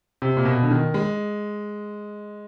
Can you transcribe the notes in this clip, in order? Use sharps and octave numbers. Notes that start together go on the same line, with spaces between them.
C3
A#2
B2
D3
D#3
G#3